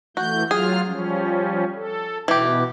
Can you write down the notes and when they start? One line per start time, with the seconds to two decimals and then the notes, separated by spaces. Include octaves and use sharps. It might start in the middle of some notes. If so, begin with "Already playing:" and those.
0.17 E3 A3 F#4 G6
0.51 F#3 F4 G#4 F6
0.86 F3 G3 C#4
1.75 A4
2.28 B2 E3 G4